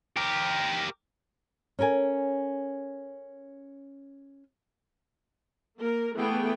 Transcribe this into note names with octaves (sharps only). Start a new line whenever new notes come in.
G4 A#4
C#4 A4 A#4 G#5
A#3 A#4
E3 A3 B3 G#4 G5